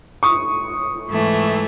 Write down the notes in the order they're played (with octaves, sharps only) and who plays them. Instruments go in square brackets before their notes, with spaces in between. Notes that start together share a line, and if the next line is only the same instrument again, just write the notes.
[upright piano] C#6 D#6
[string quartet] G#2 E3 A3